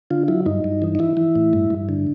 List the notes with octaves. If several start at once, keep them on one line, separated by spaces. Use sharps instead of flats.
D3 F4
F#3 E4
G2 D#4
G2
E3
D#4
E3 E4
E3
A2
G2
G2
D3